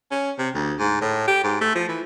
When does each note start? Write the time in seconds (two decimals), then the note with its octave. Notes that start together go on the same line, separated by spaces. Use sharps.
0.11 C#4
0.38 C3
0.54 D2
0.79 G#2
1.01 A2
1.28 G4
1.44 G#2
1.61 A3
1.75 F3
1.89 E3